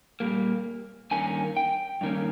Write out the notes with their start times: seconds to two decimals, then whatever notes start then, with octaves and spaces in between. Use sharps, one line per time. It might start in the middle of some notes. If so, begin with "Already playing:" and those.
0.20 A#2 G3 A#3
1.11 G2 D#3 A#3 C#4 G#5
1.57 G5
2.01 G2 D#3 A#3 C#4